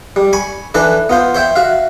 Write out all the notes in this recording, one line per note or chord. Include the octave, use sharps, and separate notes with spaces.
G3
G#5 B5 C#6
E3 D4 A4 B4
B3 F4 C5
C5 C#5 E5 G5
F#4 E5 F5